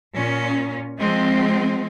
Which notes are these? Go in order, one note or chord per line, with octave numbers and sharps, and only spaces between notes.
A#2 C#4
F3 G#3 C4